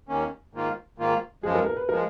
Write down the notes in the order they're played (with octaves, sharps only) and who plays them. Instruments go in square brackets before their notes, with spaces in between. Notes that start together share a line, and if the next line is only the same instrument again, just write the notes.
[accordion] D#2 D#3 A#3 C#4
G#2 D#3 A#3 F4
G#2 D#3 A#3 F4
[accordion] F#2 F3 G#3 [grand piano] G#4
[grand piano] A#4
A#4
B4
[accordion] F3 G#3 [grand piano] A#4